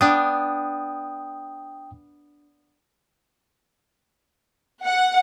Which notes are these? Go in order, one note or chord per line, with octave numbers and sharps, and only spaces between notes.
B3 D4 G5 D#6
F#5